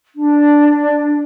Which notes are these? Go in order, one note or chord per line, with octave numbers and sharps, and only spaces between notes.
D4